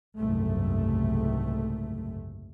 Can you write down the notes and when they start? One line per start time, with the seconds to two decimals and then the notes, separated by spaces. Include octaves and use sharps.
0.19 F#1 C2 G#2 A3